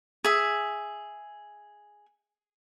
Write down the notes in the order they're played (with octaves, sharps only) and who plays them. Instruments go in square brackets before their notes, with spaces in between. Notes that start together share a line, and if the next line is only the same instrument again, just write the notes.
[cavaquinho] G#4 E5